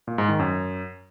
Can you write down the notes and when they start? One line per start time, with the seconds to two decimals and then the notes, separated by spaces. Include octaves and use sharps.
0.07 A#2
0.18 G#2
0.29 D#3
0.39 F#2